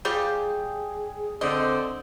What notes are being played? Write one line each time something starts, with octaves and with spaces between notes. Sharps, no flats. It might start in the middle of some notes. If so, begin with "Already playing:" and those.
G3 F4 G4 G#4
D3 C4 D#5